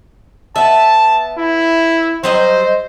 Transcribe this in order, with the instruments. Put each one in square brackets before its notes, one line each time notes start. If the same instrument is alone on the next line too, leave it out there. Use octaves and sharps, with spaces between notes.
[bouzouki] B3 E5 [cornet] A5
[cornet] E4
[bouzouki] F#3 G3 D#5 [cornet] C5